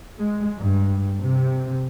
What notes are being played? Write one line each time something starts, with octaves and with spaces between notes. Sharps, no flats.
G#3
G2
C3